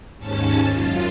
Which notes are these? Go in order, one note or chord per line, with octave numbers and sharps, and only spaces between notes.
D#2 G#2 C#4 A5 A6
F#2 F4